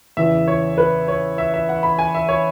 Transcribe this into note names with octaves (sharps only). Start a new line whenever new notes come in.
E2 C#3 E3 E5
C#5
B4
C#5
E5
E5
F#5
B5
G#5
E5
C#5